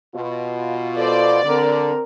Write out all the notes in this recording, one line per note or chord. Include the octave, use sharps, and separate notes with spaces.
B2 F4
A4 C5 D5
D3 C4 A#4